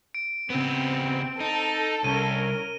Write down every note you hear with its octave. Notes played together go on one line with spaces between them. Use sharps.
D7
C#3 B3 C4
D#4 A4
C2 C#4 A#4 D#7 G7